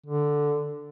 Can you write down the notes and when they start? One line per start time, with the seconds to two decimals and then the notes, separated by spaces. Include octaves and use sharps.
0.06 D3